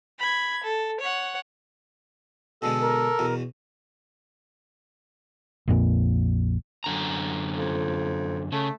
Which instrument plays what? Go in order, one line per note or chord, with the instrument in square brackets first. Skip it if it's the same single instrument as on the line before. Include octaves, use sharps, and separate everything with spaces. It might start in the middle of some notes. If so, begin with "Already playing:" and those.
[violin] B5 G#6
A4
C#5 F#5
[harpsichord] B2 D3 G#3 [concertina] A4
[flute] A#4
[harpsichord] E2 B2
[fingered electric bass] A#1 F2 A#2
[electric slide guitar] F#2 D3 A#5
[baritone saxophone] F2
[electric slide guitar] C#3 [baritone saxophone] A3